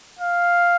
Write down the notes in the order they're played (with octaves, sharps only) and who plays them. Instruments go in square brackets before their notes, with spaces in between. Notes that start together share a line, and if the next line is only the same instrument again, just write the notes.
[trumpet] F5